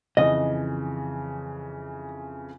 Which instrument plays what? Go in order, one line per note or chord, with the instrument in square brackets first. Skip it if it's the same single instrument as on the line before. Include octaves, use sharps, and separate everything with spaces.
[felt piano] F2 C#3 E3 [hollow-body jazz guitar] D#5